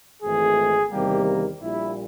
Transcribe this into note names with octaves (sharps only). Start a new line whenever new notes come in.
G#1 G#2 E3 A3 G#4
E2 C3 D#3 G3 A#3 G4
A#1 A#2 G3 E4